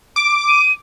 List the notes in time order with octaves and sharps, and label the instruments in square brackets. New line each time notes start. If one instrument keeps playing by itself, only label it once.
[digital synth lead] D6 [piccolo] D7
[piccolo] D#7